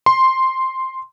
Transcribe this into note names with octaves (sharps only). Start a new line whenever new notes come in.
C6